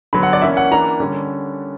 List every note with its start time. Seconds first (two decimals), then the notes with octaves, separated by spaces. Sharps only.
0.13 D3 F#3 B3 B5
0.23 F#5
0.33 D5
0.42 E3 A#3 C#4 E5
0.57 F#5
0.71 E3 A#3 D4 A#5
1.00 D3 G3 C#4